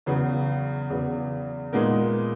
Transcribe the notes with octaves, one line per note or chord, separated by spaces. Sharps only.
E2 C#3 F#3 B3
E2 C#3 F#3 B3
A#2 G#3 B3 D#4 A#4